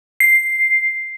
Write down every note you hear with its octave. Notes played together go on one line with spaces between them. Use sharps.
C7